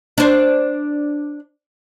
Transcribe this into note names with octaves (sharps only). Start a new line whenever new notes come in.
D4 C5